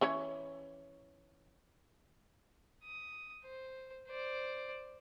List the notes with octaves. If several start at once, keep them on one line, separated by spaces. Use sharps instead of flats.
E3 C#4 C#5
D#6
C5
C5 D5